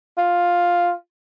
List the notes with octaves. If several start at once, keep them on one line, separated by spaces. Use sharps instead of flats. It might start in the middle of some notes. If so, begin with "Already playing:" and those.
F4